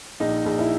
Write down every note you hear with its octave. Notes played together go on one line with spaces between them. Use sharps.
A#1 D#4
A#1
E4